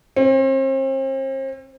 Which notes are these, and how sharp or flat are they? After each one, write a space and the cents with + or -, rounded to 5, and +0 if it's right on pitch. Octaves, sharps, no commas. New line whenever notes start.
C4 +40